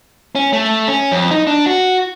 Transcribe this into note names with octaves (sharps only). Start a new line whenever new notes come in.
C#4
A3
C#4
F2
D#4
D4
F#4